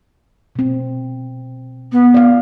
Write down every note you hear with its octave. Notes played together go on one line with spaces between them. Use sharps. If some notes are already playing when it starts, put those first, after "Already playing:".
B2 C4
B3
D5 F5